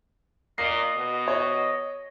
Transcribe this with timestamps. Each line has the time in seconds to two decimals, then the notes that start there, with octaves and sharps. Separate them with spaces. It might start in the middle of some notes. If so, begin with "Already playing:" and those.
0.58 A#2 D#5 C7
0.96 B2
1.28 C#5